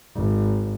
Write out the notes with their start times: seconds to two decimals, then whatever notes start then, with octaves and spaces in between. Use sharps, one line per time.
0.16 G#1